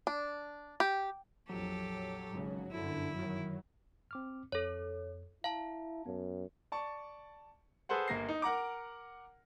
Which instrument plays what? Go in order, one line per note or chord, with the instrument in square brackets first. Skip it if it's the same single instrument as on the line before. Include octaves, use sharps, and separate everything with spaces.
[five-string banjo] D4
G4
[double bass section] A#1 F2 [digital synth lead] F#3 [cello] G4 A4
[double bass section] G#1 C#3
[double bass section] G1 F#2 D3 [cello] E4
[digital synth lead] D#3 [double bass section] F#3
[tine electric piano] C4 D6 F6
[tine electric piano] F2 [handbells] A4 C#5
[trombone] E4 [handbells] F5 A5 [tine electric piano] A#5
[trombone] F#2 [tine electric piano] B3
[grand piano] D5 A5 C#6
G#4 A4 B4 C5 F#5
G1 A#3 A#6 C7
D#4
A#4 F#5 A#5 D6